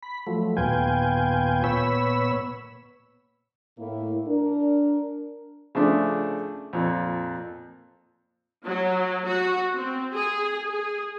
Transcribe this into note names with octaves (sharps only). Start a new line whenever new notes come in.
B5
F3 F#3 A3
D#2 A#2 B3 F4 G5 G#5
A#2 B3 C#5 B5 E6
A2 A#3 E4
D4 A#4
C#3 F3 A3 D4
F2 A#2
F#3
F#4
C4
G#4
G#4